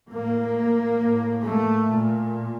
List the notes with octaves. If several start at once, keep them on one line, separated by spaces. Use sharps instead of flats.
A2 A#3
A2
A3
A#2